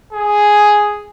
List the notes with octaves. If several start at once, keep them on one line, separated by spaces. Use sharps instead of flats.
G#4